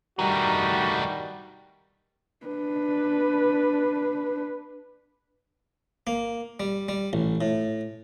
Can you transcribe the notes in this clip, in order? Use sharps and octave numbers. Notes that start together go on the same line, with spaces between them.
G2 D#3 G3 A3 D#4 F#4
D4 B4
A#3
G3
G3
A1
A2